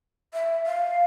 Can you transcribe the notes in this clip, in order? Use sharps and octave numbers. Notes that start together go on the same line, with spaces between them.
E5
F5